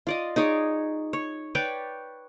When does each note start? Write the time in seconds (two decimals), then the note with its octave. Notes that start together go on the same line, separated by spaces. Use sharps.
0.07 F4 D5 D#5
0.36 D#4 G#4 C#5 D5
1.13 C#5
1.55 B4 C#5 D5 G5